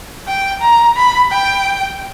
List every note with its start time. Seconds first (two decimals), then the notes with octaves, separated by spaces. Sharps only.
0.27 G5
0.61 A#5
0.96 B5
1.32 G5